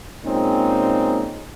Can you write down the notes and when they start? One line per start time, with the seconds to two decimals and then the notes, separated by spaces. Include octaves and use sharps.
0.25 A#2 G#3 C4 C#4 D#4